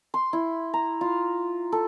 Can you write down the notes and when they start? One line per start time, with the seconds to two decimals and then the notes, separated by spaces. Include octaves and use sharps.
0.14 C6
0.33 E4
0.74 A#5
1.01 F4
1.72 A4